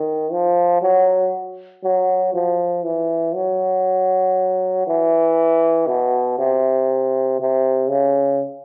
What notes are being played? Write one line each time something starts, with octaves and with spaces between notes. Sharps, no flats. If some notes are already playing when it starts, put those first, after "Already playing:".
Already playing: D#3
F3
F#3
F#3
F3
E3
F#3
E3
B2
C3
C3
C#3